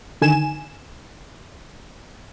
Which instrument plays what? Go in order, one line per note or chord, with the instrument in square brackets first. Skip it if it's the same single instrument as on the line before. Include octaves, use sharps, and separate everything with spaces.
[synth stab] D3 D#3 G#5 E7